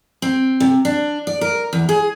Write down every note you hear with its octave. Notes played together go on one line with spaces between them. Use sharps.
C4
C3
D4
D5
A#4
E2
G#4